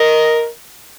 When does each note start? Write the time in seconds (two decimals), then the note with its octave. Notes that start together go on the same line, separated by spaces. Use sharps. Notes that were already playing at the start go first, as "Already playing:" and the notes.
Already playing: A#4 D#5